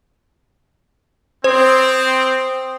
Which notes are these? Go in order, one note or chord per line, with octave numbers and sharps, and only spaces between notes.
C4 C5 C6 D#6